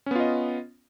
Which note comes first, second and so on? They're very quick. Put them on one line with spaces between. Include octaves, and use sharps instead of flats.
C#4 B3 F4 D#5